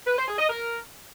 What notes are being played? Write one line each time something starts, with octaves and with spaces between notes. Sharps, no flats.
B4
C5
G#4
D#5
A#4